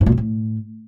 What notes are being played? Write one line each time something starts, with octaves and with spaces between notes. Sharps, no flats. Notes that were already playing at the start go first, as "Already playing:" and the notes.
G#2
A#2
F2
A2